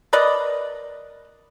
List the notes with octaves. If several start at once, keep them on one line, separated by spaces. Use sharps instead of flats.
A#4 B4 D5 D#5